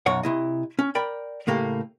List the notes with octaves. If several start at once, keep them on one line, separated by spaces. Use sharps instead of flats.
B1 F#2 C#5 F#5
C3 E4 D#5
C#4
A#4 D5 G5 B5
A2 C#3 A3 A#3 G4